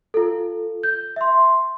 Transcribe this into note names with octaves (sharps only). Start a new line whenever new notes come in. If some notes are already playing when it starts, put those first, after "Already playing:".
F4 A4
G6
E5 C6